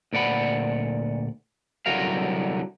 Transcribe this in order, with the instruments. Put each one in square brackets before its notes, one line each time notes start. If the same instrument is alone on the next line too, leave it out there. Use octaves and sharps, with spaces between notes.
[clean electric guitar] D2 A#2 D5 F#5 B5
C2 D3 F#3 F#4 A#4 F5